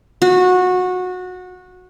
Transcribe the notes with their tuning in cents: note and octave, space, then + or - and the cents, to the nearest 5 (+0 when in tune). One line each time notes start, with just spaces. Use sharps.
F#4 -20